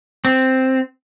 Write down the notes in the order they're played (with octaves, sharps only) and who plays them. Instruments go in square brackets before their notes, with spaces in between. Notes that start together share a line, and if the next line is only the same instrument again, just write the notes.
[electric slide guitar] C4